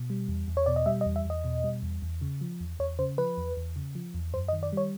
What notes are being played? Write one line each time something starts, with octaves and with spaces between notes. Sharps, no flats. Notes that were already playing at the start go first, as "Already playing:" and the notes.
Already playing: B2
G3
E2
E2
C#5
B2 D5
D#5
G3 E5
D#5
E2
E5
E2 D#5
B2
G3
E2
E2
C#3
F3
E2
E2 C#5
C#3 C5
F3 B4
E2
E2
C#3
F3
E2
F#2 C5
D#5
D#3
D5
G3 C#5